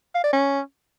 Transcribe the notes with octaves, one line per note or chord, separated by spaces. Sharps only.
F5
D5
C#4